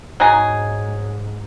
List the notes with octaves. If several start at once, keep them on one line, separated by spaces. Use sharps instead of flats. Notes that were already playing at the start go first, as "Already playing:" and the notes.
G#2 F#3 D#4 G#4